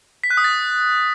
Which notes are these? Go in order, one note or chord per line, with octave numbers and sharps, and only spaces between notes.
B6
F#6
D#6
A6